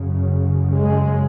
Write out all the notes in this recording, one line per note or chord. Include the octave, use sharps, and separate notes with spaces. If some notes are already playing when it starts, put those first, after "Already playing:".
Already playing: F#2 C#3
G#3